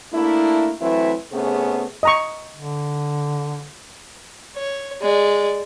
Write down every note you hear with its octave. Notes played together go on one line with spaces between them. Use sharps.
A3 A#3 D4 E4
E3 F#3 A3 C4 E4 B4
C3 A3 B3 C#4 G#4
D#5 A#5 C#6
D3
C#5
G#3 D5